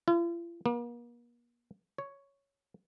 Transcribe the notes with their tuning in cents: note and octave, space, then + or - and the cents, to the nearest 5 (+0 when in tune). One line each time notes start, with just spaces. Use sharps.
F4 -45
A#3 +40
C#5 +5